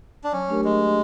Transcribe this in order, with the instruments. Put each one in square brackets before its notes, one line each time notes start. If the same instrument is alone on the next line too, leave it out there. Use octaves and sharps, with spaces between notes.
[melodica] D4
[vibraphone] F#3 [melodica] C#4
[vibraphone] A3 D4 G4 A#4
[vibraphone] F#3 [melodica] G#3
[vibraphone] A3 D4 G4 A#4